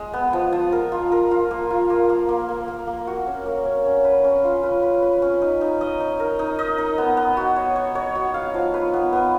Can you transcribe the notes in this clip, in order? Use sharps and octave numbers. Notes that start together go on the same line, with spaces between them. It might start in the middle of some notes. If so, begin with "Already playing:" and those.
Already playing: G#3
B3
F3
F3
A#4
F4
A#4
F4
A#3
F4
A#3
A#3
A#3
A#3
A#3
A#3
F#4
C#4
A#3
C#4
C#4
B4
C#4
F4
B4
B4
B4
C#4
D#4
D#4
D#5
D#4
A#4
D#4
D#5
D#4
B3
B3
F#4
C#5
C#5
C#5
F#4
F5
F3
B4
B3
B3